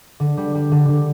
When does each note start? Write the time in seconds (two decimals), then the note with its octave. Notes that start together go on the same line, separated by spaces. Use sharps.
0.20 D3
0.37 G3
0.55 G3
0.72 D3
0.88 D3